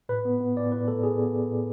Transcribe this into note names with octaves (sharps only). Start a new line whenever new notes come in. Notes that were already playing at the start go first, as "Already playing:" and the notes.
A2 B4
B3
B3
A2 D5
A2 B4
A2 A4
A2 G#4
B3
A2
A2